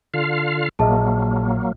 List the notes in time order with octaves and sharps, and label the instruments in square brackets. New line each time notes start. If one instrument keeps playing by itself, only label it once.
[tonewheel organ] D3 F4 F5
[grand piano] A#1 D#5 E5 [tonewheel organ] F#3 A#3 [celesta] G#4 A5